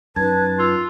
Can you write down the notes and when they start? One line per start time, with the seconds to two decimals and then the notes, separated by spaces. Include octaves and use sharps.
0.16 F#2 D#4 B4 A5 G#6
0.58 F4 A5 E6